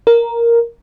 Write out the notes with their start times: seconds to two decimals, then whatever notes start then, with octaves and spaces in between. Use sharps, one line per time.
0.07 A#4